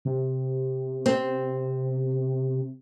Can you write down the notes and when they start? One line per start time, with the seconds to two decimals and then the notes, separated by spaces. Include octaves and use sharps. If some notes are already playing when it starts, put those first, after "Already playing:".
0.05 C3
1.06 C4